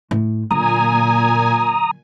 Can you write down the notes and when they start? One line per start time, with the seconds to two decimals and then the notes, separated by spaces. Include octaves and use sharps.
0.11 A2
0.51 A#2 D3 F#3 G#5 A#5 D#6